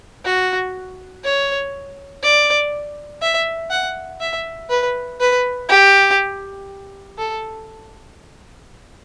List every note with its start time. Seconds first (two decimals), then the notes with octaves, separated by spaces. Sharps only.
0.25 F#4
1.24 C#5
2.23 D5
3.22 E5
3.70 F#5
4.20 E5
4.70 B4
5.20 B4
5.69 G4
7.18 A4